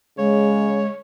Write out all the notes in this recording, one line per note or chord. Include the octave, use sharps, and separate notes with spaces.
C#3 G#3 C#5